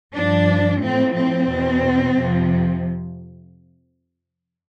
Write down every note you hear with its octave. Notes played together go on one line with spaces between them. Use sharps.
G2 F3 D4
A2 F3 C4
C4
E2 B2
F2 C3 F3